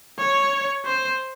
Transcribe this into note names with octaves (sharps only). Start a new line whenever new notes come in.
C#5
C5